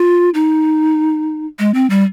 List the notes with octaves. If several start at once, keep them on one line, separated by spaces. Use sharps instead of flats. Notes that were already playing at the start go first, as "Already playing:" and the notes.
Already playing: F4
D#4
G#3
C4
G3